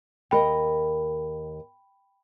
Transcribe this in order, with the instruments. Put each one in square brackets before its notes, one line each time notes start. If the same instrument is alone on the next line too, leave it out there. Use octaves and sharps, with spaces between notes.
[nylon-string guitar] D#2 A#4 D#5 [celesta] G5 B5